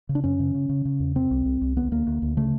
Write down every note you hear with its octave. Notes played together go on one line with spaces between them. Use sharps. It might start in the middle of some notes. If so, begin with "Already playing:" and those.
C#3
D4
F#2 C#4
C#3
C#3
C#3
C#3
E2
C3 C4
C2
C2
C2
D2 B3
D2 A#3
D2
D2
C#3 A3